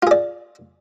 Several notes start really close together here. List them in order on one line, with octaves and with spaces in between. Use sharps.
F4 G#4 D5